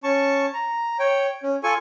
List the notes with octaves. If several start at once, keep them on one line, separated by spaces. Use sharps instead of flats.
C#4 A5 C#6
A#5
C#5 G5
C#4
F4 A4 G#5 C#6